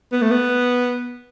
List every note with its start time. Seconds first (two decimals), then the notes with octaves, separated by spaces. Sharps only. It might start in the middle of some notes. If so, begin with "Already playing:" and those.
0.12 B3
0.22 A3
0.31 B3